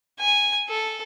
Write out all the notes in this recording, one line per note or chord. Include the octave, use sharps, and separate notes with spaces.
G#5
A4